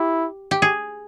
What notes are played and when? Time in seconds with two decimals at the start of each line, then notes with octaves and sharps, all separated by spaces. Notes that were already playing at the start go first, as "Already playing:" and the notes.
Already playing: E4 G4
0.51 G4
0.62 G#4